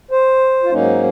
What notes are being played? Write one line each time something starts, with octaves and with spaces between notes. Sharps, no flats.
C5
F4
G#2 F#3 A#3 C#4 D#4